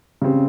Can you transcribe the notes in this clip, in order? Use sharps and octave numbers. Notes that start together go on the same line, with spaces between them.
C#3 G3 C4